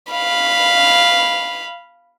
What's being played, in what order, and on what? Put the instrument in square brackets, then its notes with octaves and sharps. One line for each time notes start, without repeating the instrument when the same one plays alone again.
[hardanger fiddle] F5 B5